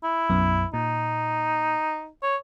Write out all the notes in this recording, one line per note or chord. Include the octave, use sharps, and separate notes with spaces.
E4
B1 F#2 B3
A#2 D#4
C#5